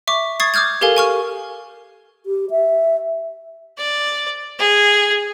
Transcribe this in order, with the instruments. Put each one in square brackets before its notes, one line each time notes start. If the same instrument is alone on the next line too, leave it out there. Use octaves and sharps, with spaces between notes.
[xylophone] E5 C#6 D6
C#6 D#6 G#6 A6 C7
D6 D#6 F6 G6 G#6
G4 A4 A#4 F5 G#5
G#5 C#6 F6
[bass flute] G4
E5
[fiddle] D5
G#4